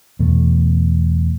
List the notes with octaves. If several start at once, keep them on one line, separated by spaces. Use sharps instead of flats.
E2 B2 A3